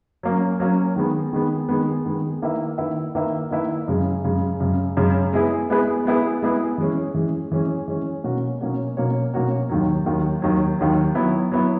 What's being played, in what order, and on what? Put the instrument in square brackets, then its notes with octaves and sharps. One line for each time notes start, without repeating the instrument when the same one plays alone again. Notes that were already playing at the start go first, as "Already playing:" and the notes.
[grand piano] F#3 A#3 C#4
F#3 A#3 C#4
D#3 G#3 B3
D#3 G#3 B3
D#3 G#3 B3
D#3 G#3 B3
D#3 A#3 E4 B4 E5
D#3 A#3 E4 B4 E5
D#3 A#3 E4 B4 E5
D#3 A#3 E4 B4 E5
F#2 C#3 G#3
F#2 C#3 G#3
F#2 C#3 G#3
F#2 C#3 G#3
G#3 B3 E4 G#4 B4
G#3 B3 E4 G#4 B4
G#3 B3 E4 G#4 B4
G#3 B3 E4 G#4 B4
E3 G#3 C#4
E3 G#3 C#4
E3 G#3 C#4
E3 G#3 C#4
B2 A#3 C#4 F#4 C#5
B2 A#3 C#4 F#4 C#5
B2 A#3 C#4 F#4 C#5
B2 A#3 C#4 F#4 C#5
D#2 D#3 F#3
D#2 D#3 F#3
D#2 D#3 F#3
D#2 D#3 F#3
F#3 B3 E4
F#3 B3 E4